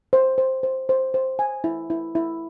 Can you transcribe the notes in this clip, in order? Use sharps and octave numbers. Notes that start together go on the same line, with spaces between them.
C5
C5
C5
C5
C5
G#5
E4
E4
E4